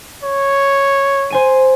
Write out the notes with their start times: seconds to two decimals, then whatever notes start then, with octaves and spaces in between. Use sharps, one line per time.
0.23 C#5
1.30 C5 G#5 D#7